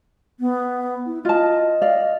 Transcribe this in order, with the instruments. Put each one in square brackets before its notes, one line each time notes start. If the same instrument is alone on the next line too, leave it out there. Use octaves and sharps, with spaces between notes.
[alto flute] B3
E4
[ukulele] F4 A5 [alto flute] D#5
[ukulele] D5 F5